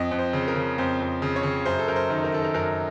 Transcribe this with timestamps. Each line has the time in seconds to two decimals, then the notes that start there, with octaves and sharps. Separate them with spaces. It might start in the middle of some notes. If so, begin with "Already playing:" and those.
Already playing: F2 D#5
0.11 F2
0.19 C5
0.33 C#3
0.48 A#4
0.56 C#3
0.78 F2 C5
1.00 F2
1.22 C#3
1.36 C#5
1.43 C#3
1.66 F#2 C5
1.79 A4
1.88 F#2 A#4
1.96 C5
2.10 D#3
2.24 A#4
2.33 D#3 A4
2.44 A#4
2.54 F#2 A#4